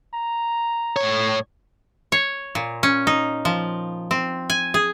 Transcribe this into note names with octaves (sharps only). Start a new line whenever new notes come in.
A#5
A2 C#5
C#5
A#2
C#4
D#4
F3
C4
G#5
G#4